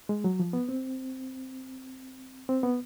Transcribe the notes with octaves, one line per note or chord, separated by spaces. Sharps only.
G#3
F#3
F3
B3
C4
C4
B3